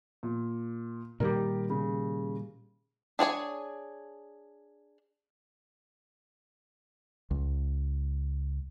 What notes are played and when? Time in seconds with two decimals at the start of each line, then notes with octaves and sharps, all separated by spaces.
0.23 A#2
1.20 A#2 D#3 G3 G4 A#4
1.70 C#3
3.19 D4 G#4 C#5 G#5
7.31 C#2